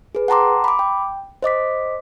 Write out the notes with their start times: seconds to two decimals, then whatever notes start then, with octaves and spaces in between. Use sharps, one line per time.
0.15 G#4 B4
0.28 F#5 G5 A5 A#5 C6 D6
0.64 B5 D6
0.79 G5
1.42 C5 D#5 D6 B6